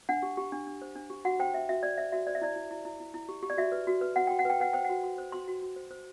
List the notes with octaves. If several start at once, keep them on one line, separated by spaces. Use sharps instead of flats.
D4 F#5
G4
G4
D4
D4
C5
D4
G4
F#4 F#5
C5 G5
C5 E5
F#4 E5
C5 D5
C5 E5
F#4 E5
C5 D5
E5
E4 D5
E4
E4
E4
E4
E4
G4
G4
D5
F#4 E5
B4
F#4
B4
F#4 F#5
F#4 G5
F#5
B4 G5
B4 F#5
C5 G5
F#5
F#4
F#4
C5
F#4 C6
F#4
F#4
C5
C5